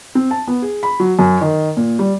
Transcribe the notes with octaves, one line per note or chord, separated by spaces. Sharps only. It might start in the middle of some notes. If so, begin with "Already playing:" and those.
C4
A5
B3
G#4
B5
F#3
F#2
D#3
A#2
G3